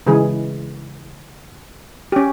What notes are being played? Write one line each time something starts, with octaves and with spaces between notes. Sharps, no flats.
C#3 E3 G#3 G#4
C#4 G4